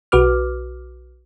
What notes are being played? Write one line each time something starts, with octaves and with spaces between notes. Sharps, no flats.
B1 F#4 B4 D6 F6